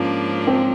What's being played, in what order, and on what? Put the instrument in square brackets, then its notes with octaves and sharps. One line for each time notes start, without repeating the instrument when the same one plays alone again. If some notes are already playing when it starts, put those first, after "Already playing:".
Already playing: [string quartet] G#2 F3 A#3 D4 [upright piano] C#4
[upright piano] C4